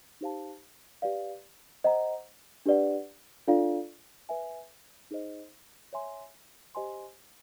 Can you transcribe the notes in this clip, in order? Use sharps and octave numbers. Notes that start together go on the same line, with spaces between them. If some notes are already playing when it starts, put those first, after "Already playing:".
D#4 G4 C5 F5 A5
G4 B4 D5 F5
C5 D#5 F#5 A#5
D4 G4 B4 D5 F#5
D4 F4 A4 D5 F5
B4 E5 G#5
D#4 G#4 C5 D#5
C#5 E5 G#5 C6
G4 C5 D#5 G#5 C6